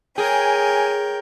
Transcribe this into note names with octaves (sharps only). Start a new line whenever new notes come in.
G#4 A#4 C#5 G5 G#5